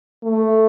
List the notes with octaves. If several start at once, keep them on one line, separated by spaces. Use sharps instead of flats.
A3